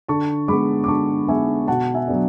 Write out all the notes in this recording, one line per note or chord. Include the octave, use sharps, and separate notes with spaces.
D3 A5 C#6
G#3 B3 B5 D6
D6
D3 A5 C#6
G#3 B3 E5 G#5
B2 F#5 A5
E5 G#5
F#3 B3 D4